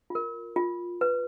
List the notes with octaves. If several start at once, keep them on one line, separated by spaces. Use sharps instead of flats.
F4 A#4
F4
B4